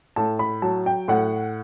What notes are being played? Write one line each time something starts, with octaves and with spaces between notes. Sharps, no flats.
A2 A5
B5
F#3 A5
G5
A2 F#5